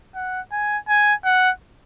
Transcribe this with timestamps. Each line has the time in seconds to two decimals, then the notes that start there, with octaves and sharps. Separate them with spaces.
0.15 F#5
0.52 G#5
0.89 G#5
1.25 F#5